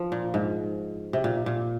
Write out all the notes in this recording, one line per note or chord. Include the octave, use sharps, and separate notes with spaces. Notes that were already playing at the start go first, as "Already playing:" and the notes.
Already playing: F3
A#2
G#2
C3
A#2
A#2